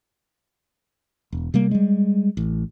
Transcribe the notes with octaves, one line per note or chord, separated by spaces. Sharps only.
E1
C3 G3 A#3
G3 G#3
A1